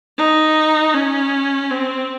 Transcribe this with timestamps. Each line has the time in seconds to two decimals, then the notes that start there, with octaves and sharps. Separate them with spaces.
0.18 D#4
0.94 C#4
1.71 C4